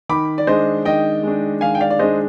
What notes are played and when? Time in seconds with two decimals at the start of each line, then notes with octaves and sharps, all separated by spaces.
0.09 D#3 B5 D6
0.38 D5
0.47 G#3 D4 C5 D#5
0.85 D#3 D#5 G5
1.23 G#3 D4
1.61 D#3 F5 G#5
1.75 G5
1.80 D5 F5
1.90 D5
1.99 G#3 D4 C5 D#5